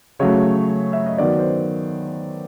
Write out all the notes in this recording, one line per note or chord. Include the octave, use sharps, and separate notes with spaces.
C#3 F#3 A3 C#5
E5
D#5
D#3 F#3 B3 D5
C5